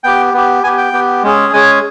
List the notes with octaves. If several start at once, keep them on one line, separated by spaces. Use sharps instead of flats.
B3 G4 G5
B3 G4
B3 G4 G#5
G5
B3 G4
G#3 C#4 G#4
G#3 C#4 G#4 G#5